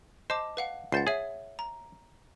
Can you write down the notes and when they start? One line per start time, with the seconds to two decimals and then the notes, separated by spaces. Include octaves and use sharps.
0.30 C5 D#5 A5 D6
0.57 B4 F5 F#5
0.92 C#2 C5 F#5 A6 C7
1.07 G#4 C#5 E5
1.59 A#5